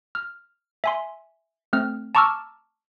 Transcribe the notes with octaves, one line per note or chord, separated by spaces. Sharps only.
F6
E5 G#5 C6
A3 C4 F6
A5 A#5 C#6 D6 E6 F6